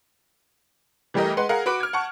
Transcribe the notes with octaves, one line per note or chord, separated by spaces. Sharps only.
E3 G3 A3 G4 A#4 D#5
G#3 B4 F#5 C6
G#4 A#4 F5 F#5
F#4 B4 B5 D6 D7
F6 G#6
F#5 A5 C#6